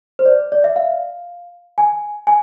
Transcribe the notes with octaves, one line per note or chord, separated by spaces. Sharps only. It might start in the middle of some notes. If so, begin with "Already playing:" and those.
C5
D5
D5
E5
F5
G#5
G#5